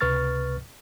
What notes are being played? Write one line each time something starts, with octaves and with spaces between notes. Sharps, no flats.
C#2 C3 B4 C#6 F6 A6